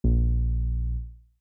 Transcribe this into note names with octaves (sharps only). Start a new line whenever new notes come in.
A#1